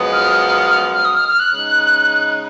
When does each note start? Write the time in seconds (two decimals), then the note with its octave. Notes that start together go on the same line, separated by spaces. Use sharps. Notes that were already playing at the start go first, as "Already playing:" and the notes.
Already playing: F#2 F3 G#3 B3
0.13 F6
0.59 F6
0.70 F6
0.94 F6
1.05 D#6
1.17 F6
1.28 F6
1.39 F#6
1.51 C#3 G#3 D#4